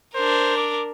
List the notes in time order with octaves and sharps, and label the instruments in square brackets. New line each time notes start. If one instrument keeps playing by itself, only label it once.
[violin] D4 A#4 [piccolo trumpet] C5
[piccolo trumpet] D6